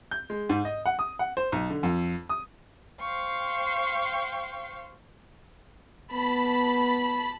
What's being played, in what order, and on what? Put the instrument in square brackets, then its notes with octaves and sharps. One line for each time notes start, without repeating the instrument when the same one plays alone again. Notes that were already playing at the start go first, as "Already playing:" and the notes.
[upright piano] G6
G#3
G#2
D#5
F#5
D#6
F#5
C5
B1
D3
F2
D#6
[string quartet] C5 F5 G5 C#6
[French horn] B3 [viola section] A5 B5